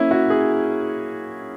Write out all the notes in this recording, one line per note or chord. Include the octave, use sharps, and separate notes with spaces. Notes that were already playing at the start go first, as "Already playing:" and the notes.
Already playing: A#3 C#4 E4
F#4
G#4